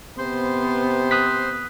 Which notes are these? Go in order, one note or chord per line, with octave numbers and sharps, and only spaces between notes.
C3 B3 C5 C6
D#6 F#6 B6